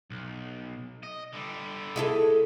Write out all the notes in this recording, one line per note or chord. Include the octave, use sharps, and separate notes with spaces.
B1
D#5
D3 G3
G#3 E4 A4